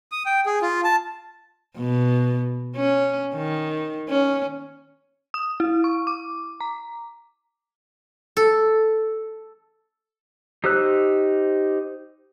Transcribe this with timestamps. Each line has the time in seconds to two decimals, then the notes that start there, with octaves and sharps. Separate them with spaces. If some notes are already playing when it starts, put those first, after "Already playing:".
0.12 D#6
0.26 G5
0.46 G#4
0.62 F4
0.84 A5
1.77 B2
2.76 C#4
3.35 D#3
4.09 C#4
5.34 D#6
5.60 E4
5.84 C#6
6.07 D6
6.60 A#5
8.37 A4
10.64 D#4 G4 C5 E6 F#6